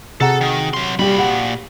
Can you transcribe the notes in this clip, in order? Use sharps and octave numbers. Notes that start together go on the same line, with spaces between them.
C3 F#4 G#4 A4 F#5 A#5
D#3
F#3 C6
A#2 G3 G4 B5
G4 F#5